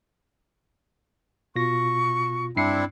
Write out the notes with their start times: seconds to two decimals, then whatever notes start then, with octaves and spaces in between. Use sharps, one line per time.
1.56 B2 F4 C#6 A#6
2.57 G2 C4 D4 E4 C7 C#7